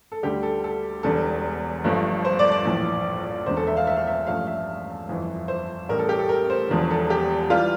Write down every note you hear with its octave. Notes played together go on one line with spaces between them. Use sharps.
A4
D2 D3 G3 G4
A4
A4
E1 E2 D3 G3 A4
G1 G2 F3 A3
C5
D5
D5
A#1 A2 E3
E1 E2 D3 C5
A4
E5
F5
E5
F5
E5
A1 G2 F3 A3 F5
E5
G1 F2 E3
C5
A1 A2 G3 A#4
A4
G4
A4
A#4
C5
E1 E2 D3 F3
A4
G4
E3 G3 F4